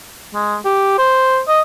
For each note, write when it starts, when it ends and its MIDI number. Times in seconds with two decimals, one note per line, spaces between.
0.34 0.56 56
0.65 0.97 67
0.98 1.40 72
1.48 1.61 75